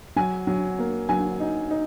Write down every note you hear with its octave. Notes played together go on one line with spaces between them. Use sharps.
F#3 G#5
F#3
A#3
F#3 G#5
D#4
D#4